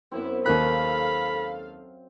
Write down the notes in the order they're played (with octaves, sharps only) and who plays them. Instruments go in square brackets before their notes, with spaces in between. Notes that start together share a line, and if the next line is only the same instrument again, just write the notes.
[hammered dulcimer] F#2 C4 [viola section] B3 E4
[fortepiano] D#2 D#3 F#6 [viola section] A4 F5 [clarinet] B5